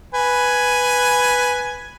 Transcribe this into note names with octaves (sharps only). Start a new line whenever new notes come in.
B4 G#5